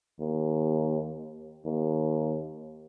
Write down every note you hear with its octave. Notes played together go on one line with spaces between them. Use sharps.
D#2
D#2